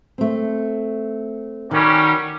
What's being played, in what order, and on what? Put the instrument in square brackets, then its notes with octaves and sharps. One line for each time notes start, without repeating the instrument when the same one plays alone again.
[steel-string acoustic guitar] A3 C4
[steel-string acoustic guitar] D#3 [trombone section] F#3 G3 C#4